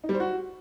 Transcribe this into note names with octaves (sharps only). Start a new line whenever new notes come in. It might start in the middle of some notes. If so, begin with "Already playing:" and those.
D#4
G3
C5
F#4